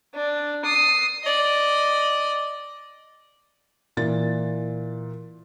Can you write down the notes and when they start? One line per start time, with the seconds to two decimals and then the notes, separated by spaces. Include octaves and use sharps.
0.15 D4
0.65 D#6 C7
1.24 D5 D#5
3.97 A#2 E3 A6